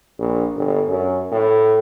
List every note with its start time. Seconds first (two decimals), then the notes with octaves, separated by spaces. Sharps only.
0.19 A#1
0.55 G1
0.88 F#2
1.31 A2